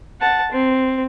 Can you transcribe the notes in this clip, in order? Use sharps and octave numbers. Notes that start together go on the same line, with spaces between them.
F#5 A5
C4